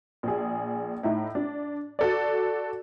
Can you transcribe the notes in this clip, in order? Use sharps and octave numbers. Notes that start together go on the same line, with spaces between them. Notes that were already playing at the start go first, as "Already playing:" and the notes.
A#1 G#4
A2 D#4 E4
D4
F#4 A4 D5